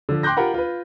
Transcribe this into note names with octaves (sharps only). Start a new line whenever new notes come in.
D3 F3
G5 C6 D6 F#6 G6 A#6
F4 G4 A#4 F#5 B5
F4 B4